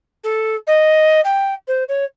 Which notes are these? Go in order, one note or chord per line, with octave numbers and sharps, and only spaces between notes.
A4
D#5
G5
C5
C#5